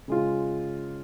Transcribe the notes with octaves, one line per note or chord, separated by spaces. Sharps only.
C#3 G#3 F4